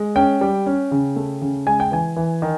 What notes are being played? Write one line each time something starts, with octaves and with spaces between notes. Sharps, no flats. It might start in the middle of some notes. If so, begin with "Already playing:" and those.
Already playing: G#3
C#4 G5
G3
C#4
C#3
A3
C#3
G#3 G#5
G5
E3 G#5
E3
D#3